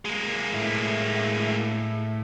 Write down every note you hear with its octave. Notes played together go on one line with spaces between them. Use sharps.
G#3 A#3
A2 E4